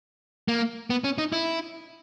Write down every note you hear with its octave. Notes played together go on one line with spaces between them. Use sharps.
A#3
B3
C#4
D#4
E4